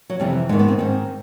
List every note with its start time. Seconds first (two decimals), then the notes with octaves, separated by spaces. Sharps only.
0.10 F#3
0.20 F2 C3 E3 G3
0.49 G#2 D#3 G#3
0.59 B3
0.68 C4
0.79 G#2 D#3 C4